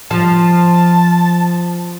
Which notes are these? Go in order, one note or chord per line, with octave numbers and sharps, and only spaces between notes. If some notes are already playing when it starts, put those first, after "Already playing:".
F3 A5